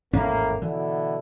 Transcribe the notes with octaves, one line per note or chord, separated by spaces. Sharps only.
G#1 E2 A2 A#3 C#4
B2 D3 E3 E4